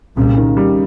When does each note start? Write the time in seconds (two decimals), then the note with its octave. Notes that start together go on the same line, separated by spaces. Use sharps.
0.17 C2 A#2 C#3 G3
0.37 D#3
0.57 G3